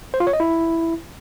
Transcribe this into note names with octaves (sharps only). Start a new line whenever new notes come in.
C5
F4
C#5
D#5
E4